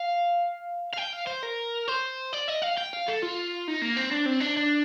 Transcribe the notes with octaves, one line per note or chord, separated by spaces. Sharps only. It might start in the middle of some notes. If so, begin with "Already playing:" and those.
Already playing: F5
F5
G5
F5
C5
A#4
C5
D5
D#5
F5
G5
F5
A4
F4
D#4
A#3
C4
D4
C4
D4
D4